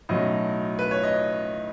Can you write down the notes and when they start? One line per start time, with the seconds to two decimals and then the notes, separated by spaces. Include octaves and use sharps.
0.09 B1 A2 F#3 C#4 D#5
0.79 B4
0.91 C#5
1.03 D#5